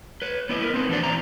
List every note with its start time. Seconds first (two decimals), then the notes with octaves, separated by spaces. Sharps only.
0.22 B4 C#5
0.49 B3 E4 D#5
0.62 A#4 B4
0.74 C4 D#4 B4
0.89 E3 D4 F#4 C5 D5
1.03 E2 B2 E3 C4 A#5